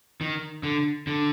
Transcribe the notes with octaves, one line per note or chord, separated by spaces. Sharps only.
D#3
D3
D3